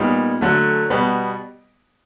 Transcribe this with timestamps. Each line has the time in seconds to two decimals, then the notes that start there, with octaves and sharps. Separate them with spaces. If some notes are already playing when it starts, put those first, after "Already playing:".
Already playing: A#2 G3 B3 D#4
0.41 D3 F#3 A3
0.90 B2 G3 B3